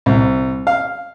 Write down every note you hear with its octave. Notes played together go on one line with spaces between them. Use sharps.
C2
F5